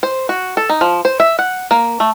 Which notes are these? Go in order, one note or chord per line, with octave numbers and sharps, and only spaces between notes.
C5
F#4
A4
D#4
F3
C5
E5
F#5
A#3
A3